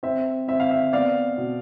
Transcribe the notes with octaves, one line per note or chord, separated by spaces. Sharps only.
C4 E5
C4 E5
F5
E5
B3 D5 F5
B2